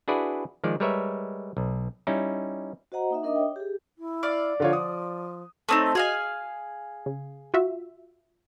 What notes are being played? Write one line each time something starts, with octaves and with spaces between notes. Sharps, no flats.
D4 E4 F#4 G#4 B4 D5
D#3 F3 G#3 D5
G3 G#3 A#4 B4 C#5 E5
B1
G3 C#4 D#4 E4
F#4 C5 D#5 F#5 A#5
A#3 D#4 E5
D4 A#4 D#5 E5 D6 D#6
C#5 G5
G4 G#4
E4
D5 F5
D3 F3 F4 C#5
D#6
A3 C4 D#4 C#5 D#6 E6
F#4 G#4 D#5 F5 G#5
C#3
F4 F#4 E5